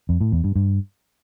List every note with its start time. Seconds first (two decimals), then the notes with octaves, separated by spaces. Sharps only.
0.09 F2
0.21 A2
0.32 E2
0.44 G2
0.55 G2